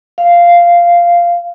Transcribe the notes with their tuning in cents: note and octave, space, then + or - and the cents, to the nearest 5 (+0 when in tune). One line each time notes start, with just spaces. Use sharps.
F5 -10